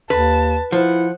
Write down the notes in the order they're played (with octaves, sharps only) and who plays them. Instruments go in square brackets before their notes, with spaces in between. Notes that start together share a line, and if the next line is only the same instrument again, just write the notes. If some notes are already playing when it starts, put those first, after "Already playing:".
[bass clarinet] D#2 [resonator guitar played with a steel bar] B4 [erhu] A5
[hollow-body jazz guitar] F3 [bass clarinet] E4 [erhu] F#5